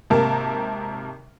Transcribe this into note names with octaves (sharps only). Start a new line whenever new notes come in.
G#1 C3 A#3 A#4 A5